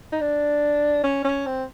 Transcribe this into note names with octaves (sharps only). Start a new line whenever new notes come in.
D#4
D4
C#4
C#4
C4